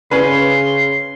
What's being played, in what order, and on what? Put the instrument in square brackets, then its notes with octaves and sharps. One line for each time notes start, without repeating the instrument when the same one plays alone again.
[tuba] C#3 [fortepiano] C#4 B4 [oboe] C6